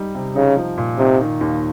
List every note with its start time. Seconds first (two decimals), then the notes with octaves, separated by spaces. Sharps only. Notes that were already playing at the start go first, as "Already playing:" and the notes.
Already playing: G3 D#4
0.15 C3
0.36 C#3 D#4
0.57 F3
0.78 A#2
0.99 C3 D#4
1.21 D#3
1.41 D#2